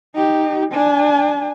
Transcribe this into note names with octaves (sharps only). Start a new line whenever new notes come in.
D#4 G4
D4 G#5